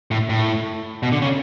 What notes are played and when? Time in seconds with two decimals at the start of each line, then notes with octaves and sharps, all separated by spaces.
0.11 A2
0.29 A2
1.03 B2
1.12 D3
1.22 C#3